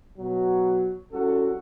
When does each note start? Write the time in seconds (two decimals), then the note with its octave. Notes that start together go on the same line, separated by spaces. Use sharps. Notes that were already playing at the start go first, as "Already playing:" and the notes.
0.18 B2 F#3
1.12 C2 C#4 F#4 A4